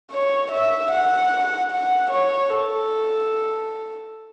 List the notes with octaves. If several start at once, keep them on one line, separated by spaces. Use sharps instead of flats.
C#5
E5
F#5
F#5
C#5
A4